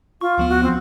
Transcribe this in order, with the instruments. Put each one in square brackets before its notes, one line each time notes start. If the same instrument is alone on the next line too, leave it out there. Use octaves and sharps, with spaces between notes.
[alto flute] F4 [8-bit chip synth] C#6
[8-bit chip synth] D2 F3 B3
[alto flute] F#4
C4